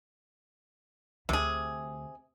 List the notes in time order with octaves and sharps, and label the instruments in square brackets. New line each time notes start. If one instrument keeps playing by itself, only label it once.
[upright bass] D2 [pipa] C3 G#4